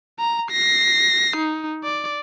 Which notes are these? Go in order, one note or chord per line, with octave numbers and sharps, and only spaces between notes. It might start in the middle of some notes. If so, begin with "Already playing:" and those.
A#5
A#6 C7
D#4
D5